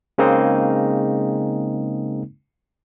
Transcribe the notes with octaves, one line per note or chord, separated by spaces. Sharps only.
C#3 G#3 A#3 C4 D#4